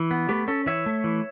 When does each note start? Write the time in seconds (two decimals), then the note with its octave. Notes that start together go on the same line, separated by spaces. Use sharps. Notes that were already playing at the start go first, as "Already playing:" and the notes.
Already playing: E3
0.11 B3
0.29 A3 G4 B4
0.48 C#4 A4 C#5
0.66 E3 C#5 E5
0.86 A3
1.04 E3